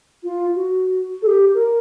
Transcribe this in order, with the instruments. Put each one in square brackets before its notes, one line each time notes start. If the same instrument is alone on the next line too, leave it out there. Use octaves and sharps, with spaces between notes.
[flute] F4
F#4
A4
G4
A#4